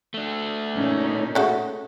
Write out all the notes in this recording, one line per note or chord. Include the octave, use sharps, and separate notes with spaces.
A3 D4
A#2 C#4 D#4
C#3 A3 F#4